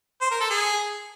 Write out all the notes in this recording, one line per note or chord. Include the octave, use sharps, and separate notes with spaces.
C5
A#4
A4
G#4